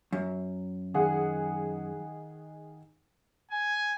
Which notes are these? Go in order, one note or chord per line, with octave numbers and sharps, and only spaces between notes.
F#2
D#3 G#4 F#5
G#5